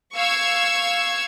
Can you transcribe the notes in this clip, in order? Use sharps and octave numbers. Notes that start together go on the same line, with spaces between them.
F5 C#6 E6 G#6